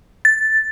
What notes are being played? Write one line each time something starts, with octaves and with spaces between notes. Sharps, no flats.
A6